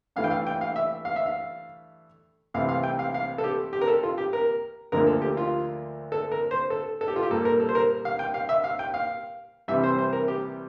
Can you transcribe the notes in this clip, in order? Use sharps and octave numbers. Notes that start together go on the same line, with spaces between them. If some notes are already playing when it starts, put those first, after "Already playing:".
G2 E3 A3 F5
G5
F5
G5
F5
E5
F5
E5
F5
C2 C3 E3 A3 C4 F5
F5
G5
F5
F5
A4
G4
G4
A#4
A4
F4
G4
A#4
D2 D3 F3 A#3 A#4
A4
G4
F4
A4
A#4
C5
A4
A4
G4
F4
G4
A#2 G3 A#3 A4
A#4
A4
C5
A#4
F5
G5
F5
E5
F5
G5
F5
C2 C3 E3 G3 E5
C5
C5
A#4
G4